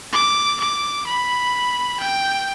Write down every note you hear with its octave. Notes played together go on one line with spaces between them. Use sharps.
D6
D6
B5
G5